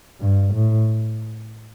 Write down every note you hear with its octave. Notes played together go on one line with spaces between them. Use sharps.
G2
A2